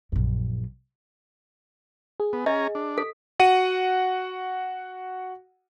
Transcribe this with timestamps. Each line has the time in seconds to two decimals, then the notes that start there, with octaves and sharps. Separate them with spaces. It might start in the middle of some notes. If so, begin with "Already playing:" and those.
0.12 A#1 F#2
2.20 G#4
2.33 B3
2.46 C#4 D#5 G#5 A#5
2.75 D4
2.98 A4 B6
3.39 F#4 F#5 D#7